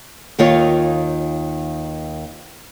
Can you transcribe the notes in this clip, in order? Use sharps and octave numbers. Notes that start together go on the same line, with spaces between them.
D#2 D#3 F4 C#5 F5